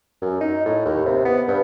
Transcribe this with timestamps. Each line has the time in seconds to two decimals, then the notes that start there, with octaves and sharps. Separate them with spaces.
0.22 F#2
0.41 D#4
0.66 A2
0.85 D#2
1.06 C3
1.25 B3
1.48 G2